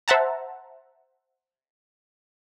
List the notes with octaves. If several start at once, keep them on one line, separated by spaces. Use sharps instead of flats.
C5 E5 F#5 A5 A#5